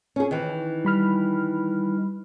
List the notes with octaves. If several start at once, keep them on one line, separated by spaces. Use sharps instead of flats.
C#4 G#4
D#3 E3
G3 B5 F6